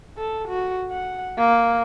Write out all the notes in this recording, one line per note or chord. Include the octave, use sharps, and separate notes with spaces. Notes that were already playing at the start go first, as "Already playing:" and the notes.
A4
F#4
F#5
A#3